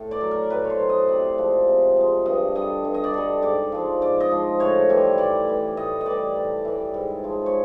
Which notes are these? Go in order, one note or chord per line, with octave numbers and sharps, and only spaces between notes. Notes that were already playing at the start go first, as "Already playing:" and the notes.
Already playing: A2
D5
F#3
A#4
A2 B4
C#5
C5
F#3
D#5
C3 D5
F3 G#3
C3
F3 G#3
G2 D#5
D3 G3 D#5
G2
D#5
D5
D3 G3 D#5
G#2 D5
F3 G#3
G#2 D5
D#5
F3 G#3
A2 C#5
E3 G3
A2 D5
E3 G3
A2 D#5
D#5
E3 G3 D5
A2
E3 G3
G#2
F3 G#3
C#5